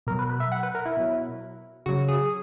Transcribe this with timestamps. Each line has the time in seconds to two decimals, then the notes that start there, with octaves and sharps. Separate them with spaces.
0.07 B2 F#3 A#4
0.19 B4
0.29 B4
0.40 E5
0.52 F#5
0.63 B4
0.75 A#4
0.86 E4
0.97 B2 F#3
1.86 C#3 F#3 F#4
2.08 G#4